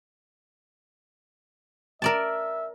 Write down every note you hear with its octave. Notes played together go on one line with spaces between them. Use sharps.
A#4 D5 E5 A5